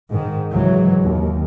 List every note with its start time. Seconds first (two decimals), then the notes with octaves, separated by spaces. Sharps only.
0.11 G#2 D#3
0.52 C#2 G#2 E3 F#3
1.02 D#2